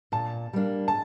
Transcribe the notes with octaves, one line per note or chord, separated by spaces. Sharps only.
A#2 A5
G3 A#3 D4
A5